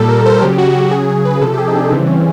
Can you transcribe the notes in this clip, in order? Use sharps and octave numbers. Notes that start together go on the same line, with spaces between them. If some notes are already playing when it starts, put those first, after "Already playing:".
Already playing: A#2 G3 A4
A#4
C5
C#3 F#3 G4
F#4
G4
C#3 F#3 G#4
G#4
B4
C3 F3 A4
G4
G#4
D#4
D4
C#3 E3 G3 C4
C#4